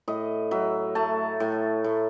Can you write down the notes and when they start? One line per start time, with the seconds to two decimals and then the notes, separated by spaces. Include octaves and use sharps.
0.08 A2 D#5
0.51 F#3 E5
0.95 A3 A5
1.40 A2
1.84 A2